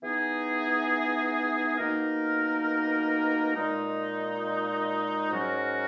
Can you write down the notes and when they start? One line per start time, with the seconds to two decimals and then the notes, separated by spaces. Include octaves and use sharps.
0.01 E3 B3 D#4 G#4
1.77 B2 A#3 D#4 A#4
3.54 A#2 G#3 D#4
5.30 G#2 F#3 C#4 F#4 A#4